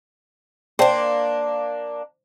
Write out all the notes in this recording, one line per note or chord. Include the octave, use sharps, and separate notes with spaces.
A#3 D4 C5 D5 G5 A5